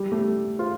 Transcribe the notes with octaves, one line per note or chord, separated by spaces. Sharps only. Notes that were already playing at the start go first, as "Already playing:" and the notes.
Already playing: G3
A3
F4